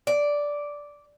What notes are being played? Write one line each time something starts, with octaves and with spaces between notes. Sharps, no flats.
D5